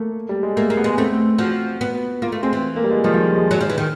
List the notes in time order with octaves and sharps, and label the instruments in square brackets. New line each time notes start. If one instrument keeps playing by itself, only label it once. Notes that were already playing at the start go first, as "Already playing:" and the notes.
Already playing: [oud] A3 [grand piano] A#3
[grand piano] G3
G#3
[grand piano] A3 [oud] A#3
[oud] A#3
[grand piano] B3
[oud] G#3
[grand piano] B3
[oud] A3 [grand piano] C4
[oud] F3 [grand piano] F#4
[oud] B3
[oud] A#3 [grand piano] F4
[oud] A3
[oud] G#3 [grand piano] C4
[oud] E3
[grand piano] A#3
G3
G#3
[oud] D#3 [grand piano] F3
[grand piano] F3
G3
G#3
[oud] F#3
F3
E3
D#3